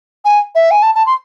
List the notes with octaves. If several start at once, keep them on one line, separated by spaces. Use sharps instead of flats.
G#5
E5
G#5
A5
A5
C6